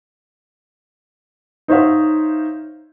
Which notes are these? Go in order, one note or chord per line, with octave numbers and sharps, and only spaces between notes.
D#4 C5 C#5 E5 F5